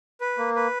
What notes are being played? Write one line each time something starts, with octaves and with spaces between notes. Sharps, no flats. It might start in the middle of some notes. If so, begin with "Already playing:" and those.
B4
A#3
B4